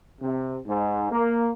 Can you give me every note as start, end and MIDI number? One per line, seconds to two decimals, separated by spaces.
0.22 0.57 48
0.67 1.08 44
1.12 1.51 58